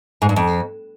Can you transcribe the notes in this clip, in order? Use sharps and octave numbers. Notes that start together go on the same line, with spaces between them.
G#2
G2
F2